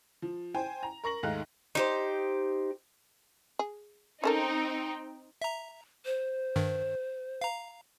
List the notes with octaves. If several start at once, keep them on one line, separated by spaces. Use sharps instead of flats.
F3
C5 G5 G#5
A#5
A#4 C#6 A#6 F#7
D#2 G#2 A3 D#4 F5 F#6
D#4 G4 C5
G#4
C4 C#4 D#4 A4 A#4 G5
E5 A#5
C5
G2 D#3
F5 A#5